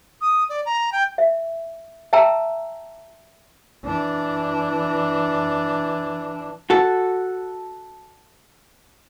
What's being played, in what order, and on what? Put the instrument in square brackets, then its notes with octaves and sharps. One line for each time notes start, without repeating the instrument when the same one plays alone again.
[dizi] D#6
D5
A#5
G5
[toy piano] E5
E5 G5 A5 A#5 E6
[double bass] E3 D4
[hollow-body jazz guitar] F#4 A4